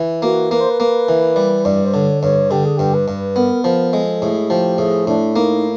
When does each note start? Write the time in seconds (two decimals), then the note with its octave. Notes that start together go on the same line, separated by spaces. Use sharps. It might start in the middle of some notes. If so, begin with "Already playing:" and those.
Already playing: E3
0.22 A#3 F#4
0.51 A#3 B4
0.60 C5
0.70 B4
0.80 A#3
1.09 E3
1.36 G3
1.65 G2 D5
1.85 C5
1.93 D3 C#5
2.23 G2 C#5
2.51 D3 G4
2.65 G#4
2.77 G2 G4
2.94 B4
3.08 G2
3.36 B3 A#4
3.64 F3 A#4
3.93 G#3 A4
4.22 A2 G#4
4.50 F3 G4
4.78 A2 G#4
5.07 A2 D4
5.36 A#3 D#4